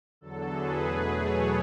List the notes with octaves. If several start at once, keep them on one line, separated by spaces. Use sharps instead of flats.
E2 D3 F#3 A4
G#4 B4
E2 B2 F#3 A3
A4 C#5